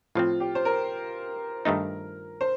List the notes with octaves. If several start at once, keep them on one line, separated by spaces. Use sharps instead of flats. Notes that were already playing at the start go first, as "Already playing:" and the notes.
A2 F3 C4 F4
G4
C5
A#4
G2 D#3 A3 D#4
C5